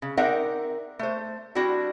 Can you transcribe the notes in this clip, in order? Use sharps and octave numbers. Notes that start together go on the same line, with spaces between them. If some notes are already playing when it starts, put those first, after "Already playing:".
C#3
C4 D#4 A#4 D5 E5 F#5
A3 C5
G3 C4 D4 E4 F#4